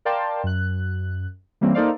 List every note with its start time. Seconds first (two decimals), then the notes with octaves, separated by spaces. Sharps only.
0.05 A#4 D5 F5 G5 A5 C6
0.44 F#2 F#6
1.61 E3 G3 A#3 C4 C#4
1.75 A#3 D#4 A4 C5 D5 F5